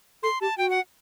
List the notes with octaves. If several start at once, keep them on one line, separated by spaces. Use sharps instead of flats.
A4 C6
G4 A5
F#4 G5
F#5